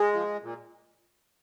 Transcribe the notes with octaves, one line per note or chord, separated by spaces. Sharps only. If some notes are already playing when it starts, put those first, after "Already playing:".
Already playing: G#3
F3
A#2